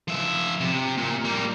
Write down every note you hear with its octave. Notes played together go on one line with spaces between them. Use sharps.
F3 E5
C3
A#2
G3 A#3